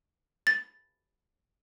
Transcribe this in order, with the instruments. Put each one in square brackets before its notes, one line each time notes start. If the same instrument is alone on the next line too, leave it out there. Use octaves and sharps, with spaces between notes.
[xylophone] A6